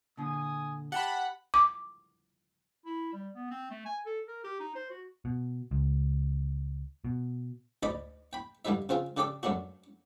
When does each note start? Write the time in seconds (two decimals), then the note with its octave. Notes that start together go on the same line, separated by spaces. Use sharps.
0.17 A#2 D3 G#5 D#6
0.92 G4 F#5 A5 B5
1.54 D6
2.86 E4
3.13 G3
3.35 B3
3.50 C4
3.71 A3
3.86 G#5
4.06 A4
4.28 A#4
4.44 G4
4.60 D#4
4.75 C5
4.90 F#4
5.25 B2
5.71 C#2
7.05 B2
7.83 D2 D#4 D5 D#5 B5 D6
8.33 G5 B5
8.65 G2 D3 G3 D#4 E5
8.89 C#3 C4 F4 G#4
9.17 C#3 D4 G4 A4 D6 D#6
9.43 F#2 A3 C#4 D4 F#4